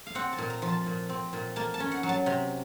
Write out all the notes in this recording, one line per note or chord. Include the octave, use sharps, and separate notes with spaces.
F5
C4 F#5
A5
A#2
A#5
F3
A5
A#2
C4
A#2
A#3 A5
A5
C#4
F#5
F#3
A5
C3